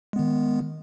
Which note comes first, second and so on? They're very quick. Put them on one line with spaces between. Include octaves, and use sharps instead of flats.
G#3 B3 D#3